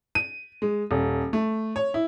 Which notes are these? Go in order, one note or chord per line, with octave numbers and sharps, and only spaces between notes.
D#7
G#3
D#1
A3
C#5
E4